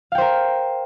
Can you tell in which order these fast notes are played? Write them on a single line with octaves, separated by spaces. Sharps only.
F5 G5 C5 A#4